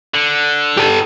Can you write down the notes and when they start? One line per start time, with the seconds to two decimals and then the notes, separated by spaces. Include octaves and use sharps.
0.15 D3
0.77 G4 A4